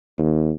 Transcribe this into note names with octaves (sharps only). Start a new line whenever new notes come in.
D#2